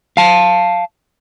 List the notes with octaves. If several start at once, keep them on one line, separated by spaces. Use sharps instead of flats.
F5 A5